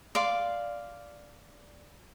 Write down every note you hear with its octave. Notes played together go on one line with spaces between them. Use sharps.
D5 F5 C6